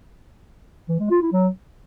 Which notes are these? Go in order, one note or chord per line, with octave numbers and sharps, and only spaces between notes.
E3
G#3
F4
E4
F#3